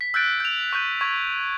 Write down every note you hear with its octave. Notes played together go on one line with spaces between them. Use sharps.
B6
E6 F#6 G6 A6 D7
G6 F7
C#6 F#6 G6 D#7
C#6 G#6